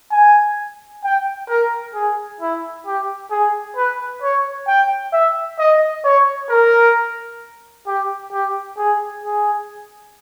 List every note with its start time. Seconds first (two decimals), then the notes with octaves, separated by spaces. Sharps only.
0.12 G#5
1.04 G5
1.48 A#4
1.95 G#4
2.41 E4
2.86 G4
3.31 G#4
3.77 B4
4.22 C#5
4.68 G5
5.13 E5
5.59 D#5
6.04 C#5
6.50 A#4
7.87 G4
8.32 G4
8.78 G#4
9.24 G#4